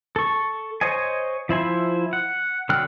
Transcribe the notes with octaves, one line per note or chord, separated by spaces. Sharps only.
A4 C#6
C5 C#5 D#5 G#5
F3 E4 C5 G#5
F#5
D3 F#3 G5 F6 F#6